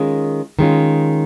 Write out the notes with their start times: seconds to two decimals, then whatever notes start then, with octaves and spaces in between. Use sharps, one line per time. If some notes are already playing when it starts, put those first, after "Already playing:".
Already playing: D#3 G#3 C#4 F4
0.59 D#3 G#3 C#4 F4